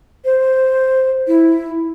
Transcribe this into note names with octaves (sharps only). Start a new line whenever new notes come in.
C5
E4